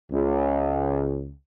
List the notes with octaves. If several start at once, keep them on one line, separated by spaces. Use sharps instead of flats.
C#2